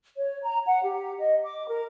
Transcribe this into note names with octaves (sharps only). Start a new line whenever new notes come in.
C#5
A#5
F#5
G4
D#5
D6
A#4